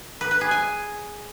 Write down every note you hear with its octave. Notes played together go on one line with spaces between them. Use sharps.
B4
B4
G#4
G#5